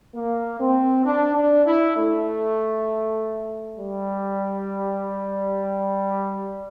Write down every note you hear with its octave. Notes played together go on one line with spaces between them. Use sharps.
A#3
C4
D4
D4
E4
A3
G3